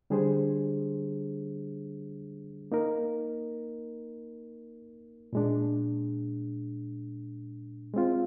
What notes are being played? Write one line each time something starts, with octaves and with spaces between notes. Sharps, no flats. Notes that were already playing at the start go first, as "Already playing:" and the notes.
D3 G3 D4 G#4 C5
A#3 D#4 A#4
A#2 G#3 D4
G#3 C4 F4